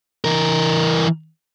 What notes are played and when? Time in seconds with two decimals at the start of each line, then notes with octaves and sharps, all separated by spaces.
0.25 E3 A#4